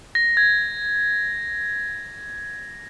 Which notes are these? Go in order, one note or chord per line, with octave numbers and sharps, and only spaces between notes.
A#6
G#6